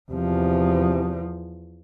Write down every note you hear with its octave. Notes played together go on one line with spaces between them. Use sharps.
E2 C3 F3